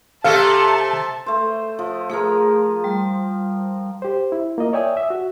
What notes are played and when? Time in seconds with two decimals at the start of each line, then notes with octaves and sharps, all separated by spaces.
0.24 C3 A3 A4 F5 A5
1.26 A3 C5
1.79 F3
2.10 F3 A3 G#4 A#4
2.84 G3
4.02 G4 C5
4.32 E4
4.58 A#3 F4 D#5
4.73 C#5 D5 E5 G5 G#5 D#6
4.97 E5
5.10 F#4